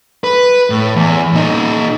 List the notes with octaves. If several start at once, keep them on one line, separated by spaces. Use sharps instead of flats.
B4
A2
E2
A#2 D#4